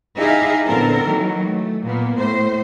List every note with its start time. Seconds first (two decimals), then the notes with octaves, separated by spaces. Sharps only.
0.16 D#4 E4 G4 G#4 E5 F5
0.66 A#2 D3 B3 C4 A4 A#4
1.05 D#3 E3 F#3 A#3
1.45 A3
1.85 A#2 A#3 B3
2.18 A2 C5